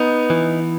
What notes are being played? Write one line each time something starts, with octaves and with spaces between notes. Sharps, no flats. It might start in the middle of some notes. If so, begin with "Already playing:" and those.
Already playing: B3 D#4
E3